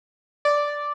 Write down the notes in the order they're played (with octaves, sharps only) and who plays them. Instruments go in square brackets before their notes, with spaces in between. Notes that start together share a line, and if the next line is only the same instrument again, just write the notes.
[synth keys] D5